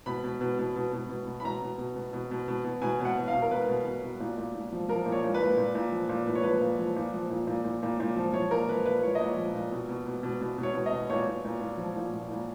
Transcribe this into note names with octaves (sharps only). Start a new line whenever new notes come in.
B2 B5
B2
B2
B2
B2
B2
B2
B2
B5
B2 A#5
B2
B2
B2
B2
B2
B2
B2
B2 G#5
B2
F#5
B2
F5
B2
A#4
B2 B4
B2
B2
B2
A#2
A#2
A#2
F3
F3 A#4
A#2
C#5
A#2
B4
A#2
A#2
A#2
F3
A#2
A#2 B4
C#5
F3 B4
A#2
F3
A#2
F3
A#2
A#2
A#2
A#2
A#2
F3
F3 C#5
A#2 A#4
F3 B4
A#2 B4
A#2 C#5
D#5
A#2
C#5
F3
A#2
B2
B2
B2
B2
B2
B2
C#5
B2
D#5
B2
A#2 C#5
A#2
A#2
A#2
F3
A#2
A#2
A#2